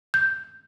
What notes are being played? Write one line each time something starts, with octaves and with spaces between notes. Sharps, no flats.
G6